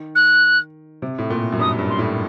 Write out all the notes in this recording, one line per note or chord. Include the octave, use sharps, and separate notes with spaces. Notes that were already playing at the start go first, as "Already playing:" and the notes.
Already playing: D#3
F#6
C3
A2
A#2
F#2
G2 D#6
G2
C6
A2